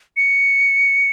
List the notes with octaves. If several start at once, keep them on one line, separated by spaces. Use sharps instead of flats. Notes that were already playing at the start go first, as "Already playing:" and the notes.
C#7